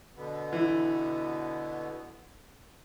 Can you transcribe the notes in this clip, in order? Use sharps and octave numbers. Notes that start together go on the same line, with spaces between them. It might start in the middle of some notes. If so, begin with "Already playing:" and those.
B2 D3 B3
E3